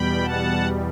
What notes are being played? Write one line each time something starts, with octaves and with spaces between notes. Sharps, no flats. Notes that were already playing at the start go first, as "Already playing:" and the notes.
Already playing: E2 B2 G3 G5 B5
F#5 A5